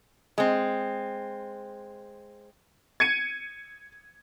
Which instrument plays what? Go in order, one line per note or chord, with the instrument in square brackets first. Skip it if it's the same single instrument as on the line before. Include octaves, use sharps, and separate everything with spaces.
[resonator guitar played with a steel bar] G#3 C4
[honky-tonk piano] G#6 C#7 D#7